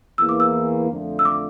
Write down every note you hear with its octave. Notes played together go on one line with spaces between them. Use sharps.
E2 E3 A#3 E6
D6
E6
F2 D3 F3 A3
E6
D6